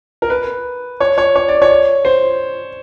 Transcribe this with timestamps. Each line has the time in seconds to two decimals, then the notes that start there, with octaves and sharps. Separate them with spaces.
0.22 A#4
0.30 B4
1.00 C#5
1.18 C#5
1.35 C#5
1.48 D5
1.62 C#5
2.05 C5